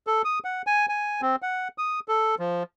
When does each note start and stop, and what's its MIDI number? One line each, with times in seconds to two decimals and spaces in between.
0.07 0.22 69
0.24 0.39 87
0.44 0.62 78
0.67 0.86 80
0.89 1.21 80
1.21 1.36 60
1.42 1.68 78
1.78 2.00 87
2.08 2.35 69
2.39 2.63 53